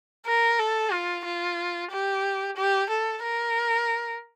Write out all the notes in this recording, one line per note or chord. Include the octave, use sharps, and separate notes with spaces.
A#4
A4
F4
F4
G4
G4
A4
A#4